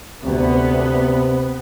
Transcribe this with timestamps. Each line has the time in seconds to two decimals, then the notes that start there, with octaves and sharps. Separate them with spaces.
0.24 D2 C3 B3